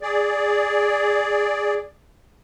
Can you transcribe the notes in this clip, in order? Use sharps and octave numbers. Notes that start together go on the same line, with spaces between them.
G#4 D5